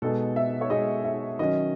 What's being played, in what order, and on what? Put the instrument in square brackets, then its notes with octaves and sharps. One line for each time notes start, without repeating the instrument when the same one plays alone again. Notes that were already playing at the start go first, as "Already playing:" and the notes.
[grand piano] B2 G#3 D#4 G#4 [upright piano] A4
[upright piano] E5
C#5
[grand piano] B2 G#3 D#4 G#4 [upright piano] D#5
[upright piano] E5
[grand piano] D#3 F#3 C#4 [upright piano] D#5